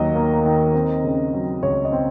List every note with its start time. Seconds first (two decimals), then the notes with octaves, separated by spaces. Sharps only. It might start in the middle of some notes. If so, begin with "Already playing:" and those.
Already playing: D#2 D#3 F#3 A#3 D#5
0.15 A#3
0.45 D#3
0.75 C4
1.04 C#3
1.34 F#3
1.63 C#2 C#5
1.85 D#5
1.92 C4